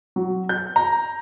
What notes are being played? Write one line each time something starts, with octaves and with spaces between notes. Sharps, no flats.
F#3
G6
A#5